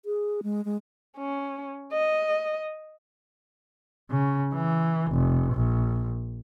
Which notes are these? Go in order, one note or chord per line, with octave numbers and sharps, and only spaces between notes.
G#4
G#3
G#3
C#4
D#5
C#3
E3
F1
A#1